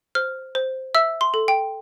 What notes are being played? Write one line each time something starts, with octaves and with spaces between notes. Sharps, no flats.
C5 F6
C5
E5 E6
C6
A4
G5